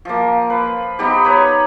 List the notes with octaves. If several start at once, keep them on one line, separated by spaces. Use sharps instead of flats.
F3 A#3
B4
B3 D#4 G4
B4 C#5 A#5